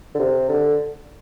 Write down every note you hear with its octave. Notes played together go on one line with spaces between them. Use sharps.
D3
C3
D3